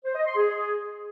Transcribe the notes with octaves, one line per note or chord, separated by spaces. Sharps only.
C5
D#5
C6
G#4